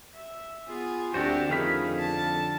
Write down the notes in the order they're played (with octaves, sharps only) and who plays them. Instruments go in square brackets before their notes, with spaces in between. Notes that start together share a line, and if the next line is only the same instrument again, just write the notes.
[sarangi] E5
[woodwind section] B3 F4 [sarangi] G#4
[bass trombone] D2 [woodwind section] A3 C4 [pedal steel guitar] D4 F#4 C5 [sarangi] G4
[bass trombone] F2 [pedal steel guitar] D3 F5 B5 [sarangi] D#3 [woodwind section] A3 C#4 G#4
[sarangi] A5